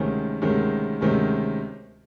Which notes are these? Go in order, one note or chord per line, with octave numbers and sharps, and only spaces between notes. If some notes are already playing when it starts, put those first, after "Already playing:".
Already playing: D2 C3 D#3 G#3 C#4
D2 C3 D#3 G#3 C#4
D2 C3 D#3 G#3 C#4